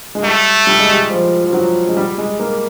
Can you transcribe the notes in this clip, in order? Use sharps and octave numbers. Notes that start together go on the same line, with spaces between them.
G#3
G3 A3
G3
G#3
G3
F3
F3
F#3
G#3
G3
G#3
A#3